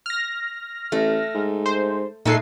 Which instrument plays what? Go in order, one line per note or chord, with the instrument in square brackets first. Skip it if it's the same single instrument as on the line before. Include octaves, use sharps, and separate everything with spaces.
[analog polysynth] F6 A#6
[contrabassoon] A1 [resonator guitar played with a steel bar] A3
[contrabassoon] G#2
[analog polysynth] C5
[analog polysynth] A#2 A4 C7 [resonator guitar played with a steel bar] G#3 A3 D#4